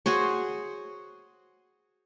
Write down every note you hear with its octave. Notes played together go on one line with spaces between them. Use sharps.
F#4 G#4 C5 C#5